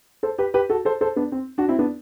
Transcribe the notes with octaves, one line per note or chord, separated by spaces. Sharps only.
A4 C5
G4 B4
G4 B4
F#4 A4
A4 C5
A4 C5
B3 D4
C4
D4 F#4
C4 E4
B3 D4